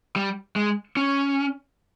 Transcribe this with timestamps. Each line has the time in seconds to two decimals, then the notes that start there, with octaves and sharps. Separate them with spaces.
0.16 G3
0.56 G#3
0.97 C#4